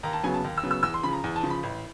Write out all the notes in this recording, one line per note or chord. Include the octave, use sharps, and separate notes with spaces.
D#2 A#5
A5
C#3 F#3 B3 G#5
A5
D#2
E6
C#3 F#3 B3
E6
E2 E6
C6
C#3 F3 B5
A#5
E2
A5
C#3 F3
B5
A1